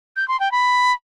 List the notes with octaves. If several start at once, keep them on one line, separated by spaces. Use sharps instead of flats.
G6
C6
G5
B5